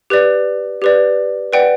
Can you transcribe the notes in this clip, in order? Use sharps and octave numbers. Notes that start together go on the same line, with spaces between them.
G4 B4 D5
G4 B4 D5
B4 D5 F#5 G5